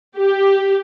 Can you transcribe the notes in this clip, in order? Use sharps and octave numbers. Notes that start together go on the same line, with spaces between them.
G4